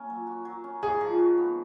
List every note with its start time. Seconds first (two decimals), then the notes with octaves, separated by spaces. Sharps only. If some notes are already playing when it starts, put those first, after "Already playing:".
Already playing: A#3 C#4
0.10 F#3
0.27 F#4
0.45 F#3
0.64 C#4
0.82 G#2 G#4
1.01 F3
1.19 F#4
1.38 B3